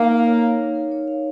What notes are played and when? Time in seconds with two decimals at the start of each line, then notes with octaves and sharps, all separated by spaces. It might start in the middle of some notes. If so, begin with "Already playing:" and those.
Already playing: A#3 D#4
0.10 A#4
0.26 C#5
0.42 F5
0.59 D#4
0.75 A#4
0.92 C#5
1.08 F5